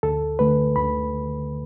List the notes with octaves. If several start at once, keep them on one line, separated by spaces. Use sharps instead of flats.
D2 A4
D3 A3 B4
D2 B5